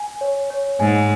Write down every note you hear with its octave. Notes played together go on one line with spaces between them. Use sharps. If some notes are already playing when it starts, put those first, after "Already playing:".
Already playing: G#5
C#5
C#5
G#2 G#5